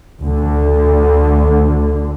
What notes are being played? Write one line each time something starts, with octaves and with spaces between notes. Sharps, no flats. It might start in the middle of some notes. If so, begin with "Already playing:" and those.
D2 D3